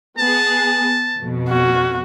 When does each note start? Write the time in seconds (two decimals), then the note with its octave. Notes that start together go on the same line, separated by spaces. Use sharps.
0.18 B3 G#4 A5
1.16 F2 B2
1.50 C#4 F#4